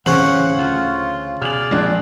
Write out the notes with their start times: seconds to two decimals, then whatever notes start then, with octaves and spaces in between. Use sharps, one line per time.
0.06 D1 C#3 E3 C#4 C5 F#5 F#7
0.58 D2 F4
1.42 B2 G#4 D5 F6 F7 F#7
1.71 A#1 F2 G#3 D4 F#6